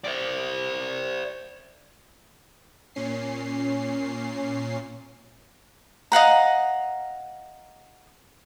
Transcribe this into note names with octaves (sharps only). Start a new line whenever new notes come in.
C5 D5
A#2 C#4 C7
D#5 F5 F#5 A#5